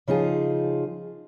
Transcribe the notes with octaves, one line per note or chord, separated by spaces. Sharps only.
C#3 F3 D#4 F4 G#4